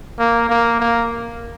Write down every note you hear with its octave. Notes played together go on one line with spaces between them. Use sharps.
A#3
A#3
A#3